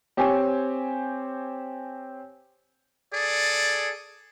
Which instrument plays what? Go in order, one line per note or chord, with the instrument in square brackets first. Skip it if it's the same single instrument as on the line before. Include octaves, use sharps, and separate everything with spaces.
[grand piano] C4 G4 C5 C#5 G#5
[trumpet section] G#4 A4 D5